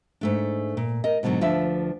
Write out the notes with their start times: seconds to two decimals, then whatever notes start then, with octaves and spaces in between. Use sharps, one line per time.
0.21 G#2 A3 D4
0.77 A#2
1.04 A#4 D#5
1.23 G#2 B2 D3 F3 F#3
1.41 D2 F3 D4 B4 E5